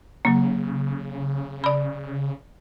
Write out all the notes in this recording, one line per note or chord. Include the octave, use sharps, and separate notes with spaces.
C#3 F#3 A#3
D5 B5